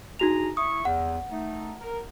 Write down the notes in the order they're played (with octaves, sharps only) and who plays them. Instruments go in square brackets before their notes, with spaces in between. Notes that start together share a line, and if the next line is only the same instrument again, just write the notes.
[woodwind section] D4 G#4 A#5 [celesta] D#4 F#4 F7
[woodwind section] E4 C#6 [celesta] D#6
[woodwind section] E2 [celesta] F#5
[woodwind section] A3 D#4
A#4